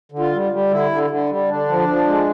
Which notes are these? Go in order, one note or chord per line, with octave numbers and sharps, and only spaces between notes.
D3
F4
G3
G3
D3 E4
D3
D3
G3
D3 D4
F3
F3
G#3